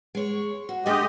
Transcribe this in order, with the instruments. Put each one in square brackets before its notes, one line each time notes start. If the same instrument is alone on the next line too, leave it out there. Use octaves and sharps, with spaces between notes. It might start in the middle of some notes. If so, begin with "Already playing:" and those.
[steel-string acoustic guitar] G#3 C#5
F#4
[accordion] G#3 G4 D#5 [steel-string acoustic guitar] A3 D4 G#4